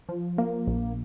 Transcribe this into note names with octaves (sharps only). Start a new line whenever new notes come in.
F3
A#3
A#1